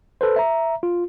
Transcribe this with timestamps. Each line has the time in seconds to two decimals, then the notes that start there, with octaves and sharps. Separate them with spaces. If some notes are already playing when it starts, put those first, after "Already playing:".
0.21 A4 B4 C5
0.36 E5 A#5
0.83 F4